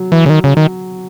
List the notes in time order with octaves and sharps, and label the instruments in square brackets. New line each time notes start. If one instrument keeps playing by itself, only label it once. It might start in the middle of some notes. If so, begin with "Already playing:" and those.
Already playing: [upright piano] F#3
[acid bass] E3
C#3
D#3
C#3
D#3